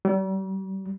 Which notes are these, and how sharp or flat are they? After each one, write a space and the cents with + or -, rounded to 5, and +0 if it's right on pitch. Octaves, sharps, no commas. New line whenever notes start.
G3 -40